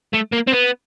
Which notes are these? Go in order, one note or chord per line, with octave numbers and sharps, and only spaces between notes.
A3
A#3
C4
B3